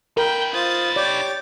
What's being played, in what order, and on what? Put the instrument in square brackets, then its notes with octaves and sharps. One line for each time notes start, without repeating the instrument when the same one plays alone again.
[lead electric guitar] D#4 B4 [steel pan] A#4 [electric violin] G5
[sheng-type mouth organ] F4 C5 D#6 [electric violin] A6
[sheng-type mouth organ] G4 C#5 D6 [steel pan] D5